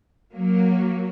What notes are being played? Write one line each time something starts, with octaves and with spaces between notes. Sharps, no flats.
F#3 A#3